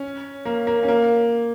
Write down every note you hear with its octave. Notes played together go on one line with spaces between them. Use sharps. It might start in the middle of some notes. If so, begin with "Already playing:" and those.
Already playing: C#4
A#3
A#3
C#4
A#3